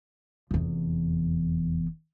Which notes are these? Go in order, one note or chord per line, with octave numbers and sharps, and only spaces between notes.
F1 E2